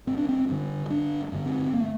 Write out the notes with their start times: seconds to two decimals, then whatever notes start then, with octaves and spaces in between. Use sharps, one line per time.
0.07 G1 C4
0.17 D4
0.29 C4
0.48 G2 D3
0.90 G1 D4
1.32 G2 D3
1.46 C4
1.73 A#3
1.80 A3